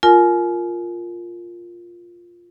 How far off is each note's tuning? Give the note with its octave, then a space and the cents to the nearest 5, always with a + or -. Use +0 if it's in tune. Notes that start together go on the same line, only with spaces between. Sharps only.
F4 +0 A#4 +0 G#5 +35